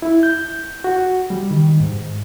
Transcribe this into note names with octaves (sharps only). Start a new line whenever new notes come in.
E4
G6
F#4
G3
D#3
G#2